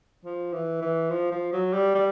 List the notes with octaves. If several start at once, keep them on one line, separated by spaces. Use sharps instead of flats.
F3
E3
E3
F3
F3
F#3
G3
G3